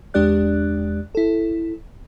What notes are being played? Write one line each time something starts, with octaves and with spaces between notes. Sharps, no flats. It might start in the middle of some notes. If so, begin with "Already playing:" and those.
E2 G#3 D4 G4 D5 F#6
E4 A4